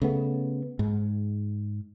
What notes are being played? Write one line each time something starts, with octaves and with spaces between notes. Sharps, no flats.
C#3 A3 B3
G#2